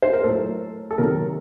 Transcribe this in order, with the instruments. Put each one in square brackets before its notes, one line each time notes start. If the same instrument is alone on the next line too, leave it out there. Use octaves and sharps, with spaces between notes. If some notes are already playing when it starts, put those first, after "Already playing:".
[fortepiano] C5
A#4
A2 F#3 A4
A4
C3 D#3 F#3 A#4